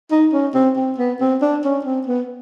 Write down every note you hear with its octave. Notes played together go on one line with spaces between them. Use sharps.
D#4
C#4
C4
C4
B3
C4
D4
C#4
C4
B3